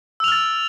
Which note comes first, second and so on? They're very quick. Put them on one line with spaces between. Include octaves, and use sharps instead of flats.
E6 F7 F6 A6